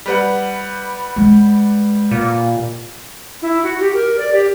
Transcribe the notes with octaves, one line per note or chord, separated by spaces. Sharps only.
G3 B4 F#5
G#3
A#2
E4
F#4
G4
A#4
D5
G4